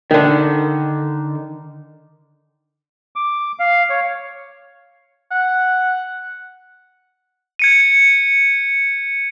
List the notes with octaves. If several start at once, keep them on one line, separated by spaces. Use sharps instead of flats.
D3 D#3
D6
F5
C#5
F#5
G#6 C#7 D#7